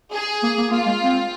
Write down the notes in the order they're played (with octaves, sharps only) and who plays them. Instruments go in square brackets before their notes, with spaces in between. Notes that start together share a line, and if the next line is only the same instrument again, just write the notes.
[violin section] G#4
[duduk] A#3
A#3
[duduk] A#3 [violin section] F4
[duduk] G#3
C4